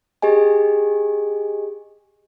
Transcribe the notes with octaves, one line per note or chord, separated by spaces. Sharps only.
G4 G#4 D#5 G#5